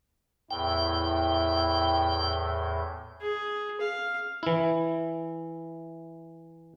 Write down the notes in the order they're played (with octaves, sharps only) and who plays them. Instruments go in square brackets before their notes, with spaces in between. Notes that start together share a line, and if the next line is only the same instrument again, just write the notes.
[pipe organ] E2 A2 [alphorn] E4 [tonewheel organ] G5
[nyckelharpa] G#4
F5
[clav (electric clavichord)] E3 E4